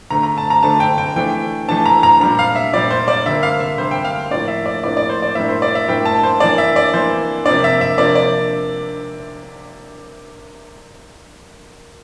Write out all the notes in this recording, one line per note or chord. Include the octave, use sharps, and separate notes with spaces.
D3 A3 D4 A#5
A#5
A5
A#5
D3 A3 D4 A5
G5
G5
E3 A3 D4 G5
E3 A3 D4 A5
A#5
A#5
A#2 G3 D4 A#5
F5
E5
A#2 G3 D4 D5
C5
D5
D3 G3 A#3 E5
F5
E5
D3 G3 A#3 C5
G5
F5
A2 F3 A#3 D4 D5
E5
D5
A2 F3 A#3 D4 D5
D5
C5
D5
A2 G3 A#3 D4 E5
C5
D5
E5
A2 G3 A#3 D4 G5
A5
C5
E3 A#3 D4 D5
E5
D5
E3 A#3 D4 C5
C3 F3 A#3 D4 D5
E5
E5
C3 F3 A#3 D4 D5
D5